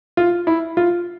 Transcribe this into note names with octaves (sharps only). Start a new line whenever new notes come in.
F4
E4
F4